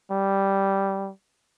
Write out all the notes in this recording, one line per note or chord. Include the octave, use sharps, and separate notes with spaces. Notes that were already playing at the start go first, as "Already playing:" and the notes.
G3